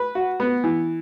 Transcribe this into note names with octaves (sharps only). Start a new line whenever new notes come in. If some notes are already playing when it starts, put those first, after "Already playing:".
Already playing: B4
F#4
B3
E3